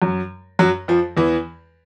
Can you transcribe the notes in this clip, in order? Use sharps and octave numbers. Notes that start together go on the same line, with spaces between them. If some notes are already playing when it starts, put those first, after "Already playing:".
F#2 F#3
F#2 F#3
F2 F3
E2 E3